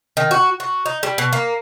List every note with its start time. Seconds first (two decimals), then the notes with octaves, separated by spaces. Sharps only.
0.17 D#3
0.31 F#4
0.60 F#4
0.86 D#4
1.03 G3
1.18 B2
1.33 A#3